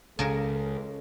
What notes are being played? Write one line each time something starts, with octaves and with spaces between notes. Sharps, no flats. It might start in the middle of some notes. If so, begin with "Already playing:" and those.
C#2 C#3 A4 A#4